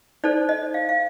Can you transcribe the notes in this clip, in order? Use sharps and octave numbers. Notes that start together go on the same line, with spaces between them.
D#4 A4 C5 D5
D#5
F5
F5